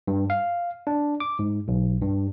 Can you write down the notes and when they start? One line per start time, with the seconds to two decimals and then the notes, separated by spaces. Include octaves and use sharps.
0.07 G2
0.30 F5
0.87 D4
1.20 D6
1.39 G#2
1.68 B1
2.02 G2